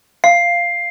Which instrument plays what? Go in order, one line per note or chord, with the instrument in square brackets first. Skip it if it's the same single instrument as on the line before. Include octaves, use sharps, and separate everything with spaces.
[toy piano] F5 [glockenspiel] C7